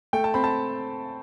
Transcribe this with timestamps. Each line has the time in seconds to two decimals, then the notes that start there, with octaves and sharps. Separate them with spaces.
0.13 A3 G5
0.24 A5
0.34 C4 B5
0.44 A5